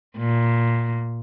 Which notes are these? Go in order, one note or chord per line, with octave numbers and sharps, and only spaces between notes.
A#2